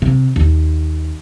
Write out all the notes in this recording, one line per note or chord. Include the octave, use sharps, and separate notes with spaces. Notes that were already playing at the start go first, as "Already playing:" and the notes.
C3
D#2